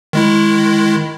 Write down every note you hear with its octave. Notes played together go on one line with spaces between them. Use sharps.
D#3 G#3 E4